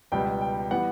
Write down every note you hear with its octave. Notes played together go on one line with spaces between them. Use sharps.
C#2 B2 G3 B3 G5
G5
E3 G3 B3 F#5